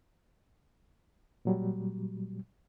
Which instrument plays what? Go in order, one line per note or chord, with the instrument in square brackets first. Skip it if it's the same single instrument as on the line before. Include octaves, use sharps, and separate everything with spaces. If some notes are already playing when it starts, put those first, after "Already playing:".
[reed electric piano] A#2 F#3 G3